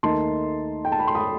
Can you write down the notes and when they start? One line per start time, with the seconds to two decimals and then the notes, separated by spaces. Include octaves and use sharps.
0.03 D#2 D#3 A3 D#4 A5 C6
0.85 G5
0.92 A5
0.99 B5
1.07 C6
1.15 B5 D#6